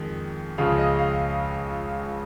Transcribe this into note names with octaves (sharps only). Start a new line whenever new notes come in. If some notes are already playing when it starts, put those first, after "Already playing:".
Already playing: F2 D#3 G#3
C#2 C#3 F3 G#3 F5
D#5
F5